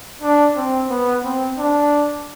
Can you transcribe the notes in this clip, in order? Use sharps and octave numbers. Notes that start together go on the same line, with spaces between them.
D4
C4
B3
C4
D4